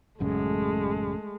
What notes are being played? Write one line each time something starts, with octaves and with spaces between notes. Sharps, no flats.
A1 F#2 C#3 G#3 A3